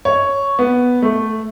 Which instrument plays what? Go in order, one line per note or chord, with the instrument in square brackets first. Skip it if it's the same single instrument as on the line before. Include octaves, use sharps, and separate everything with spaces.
[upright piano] C#5
B3
A3